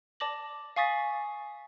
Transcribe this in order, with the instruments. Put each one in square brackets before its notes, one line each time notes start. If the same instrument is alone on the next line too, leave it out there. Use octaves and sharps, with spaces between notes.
[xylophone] D5 A5 D6 A#6 F#7
F5 G#5 C#6 D#6 A6 B6